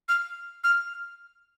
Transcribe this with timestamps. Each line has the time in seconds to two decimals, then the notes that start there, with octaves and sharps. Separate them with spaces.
0.09 F6
0.64 F6